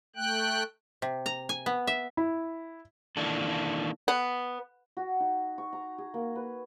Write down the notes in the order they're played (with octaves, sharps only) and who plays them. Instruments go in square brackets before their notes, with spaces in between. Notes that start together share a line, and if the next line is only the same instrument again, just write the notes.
[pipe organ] A3 G5 F#6
[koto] C3
A#5
G#5
B3
E5
[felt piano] E4
[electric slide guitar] D#3 E3 A#3 D4 A4
[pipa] B3
[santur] F#4
D#4
C#6
A#5
G#4
A#3
B4